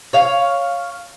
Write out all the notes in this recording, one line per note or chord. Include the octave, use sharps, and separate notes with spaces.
C#5 F5